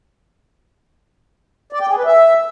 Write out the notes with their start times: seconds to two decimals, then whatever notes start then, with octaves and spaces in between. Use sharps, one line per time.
1.73 D5
1.81 G5
1.89 G#4
1.97 B4
2.05 E5